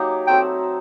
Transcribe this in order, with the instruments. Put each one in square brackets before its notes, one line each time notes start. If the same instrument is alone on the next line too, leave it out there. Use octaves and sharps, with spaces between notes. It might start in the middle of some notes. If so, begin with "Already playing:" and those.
Already playing: [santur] F#3 A#3 D#4 G4
[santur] F#3 A3 C4 [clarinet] G5